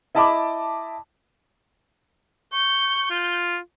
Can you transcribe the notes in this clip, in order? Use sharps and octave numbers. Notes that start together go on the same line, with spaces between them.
E4 D#5 A5 B5 D6
C#6 G6
F4